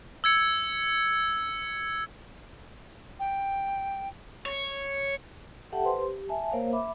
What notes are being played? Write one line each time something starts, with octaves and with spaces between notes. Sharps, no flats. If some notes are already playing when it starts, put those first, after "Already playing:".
E6 G#6 C#7
G5
C#5
G4 A4 E5 F#5 G5 A5
B4 C5 C6
G4
E5 G#5 A5
A#3 A#4 C5 C#5 F5
E5 B5 D6